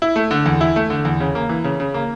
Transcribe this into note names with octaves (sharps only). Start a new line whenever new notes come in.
E4
A3
D3
E2
E4
A3
D3
E2
C#3
A#3
E3
C#3
C#3
A#3